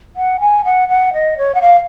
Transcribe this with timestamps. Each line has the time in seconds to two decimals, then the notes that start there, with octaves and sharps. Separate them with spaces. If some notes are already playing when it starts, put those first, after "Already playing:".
0.16 F#5
0.40 G#5
0.65 F#5
0.89 F#5
1.14 D#5
1.38 C#5
1.55 F#5
1.62 F5